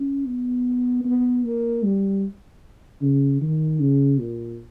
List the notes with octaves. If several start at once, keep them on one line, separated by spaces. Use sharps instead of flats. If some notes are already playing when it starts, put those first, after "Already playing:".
Already playing: C#4
B3
B3
A#3
G3
C#3
D#3
C#3
A#2